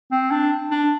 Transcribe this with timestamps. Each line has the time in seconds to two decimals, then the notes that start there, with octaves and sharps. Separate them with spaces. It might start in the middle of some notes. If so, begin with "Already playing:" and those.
0.12 C4
0.31 D4
0.71 D4